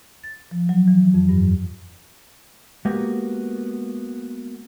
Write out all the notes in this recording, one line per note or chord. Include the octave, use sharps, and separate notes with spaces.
A6
F3
F#3
E3
F2
G2
G#3 A#3 B3 F#4 G4 A#4